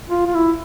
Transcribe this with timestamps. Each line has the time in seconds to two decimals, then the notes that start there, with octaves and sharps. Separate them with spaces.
0.10 F4
0.27 F4
0.34 E4